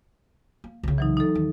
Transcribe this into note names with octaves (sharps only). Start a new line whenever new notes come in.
A#3
C2 C#3
E3 F#3 D#4
D#4 A4
D#2